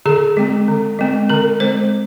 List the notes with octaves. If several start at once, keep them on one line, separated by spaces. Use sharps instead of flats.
D3 G#4
G#3 C4
D3
G#3 C4
D3 A#4
G#3 C4 C5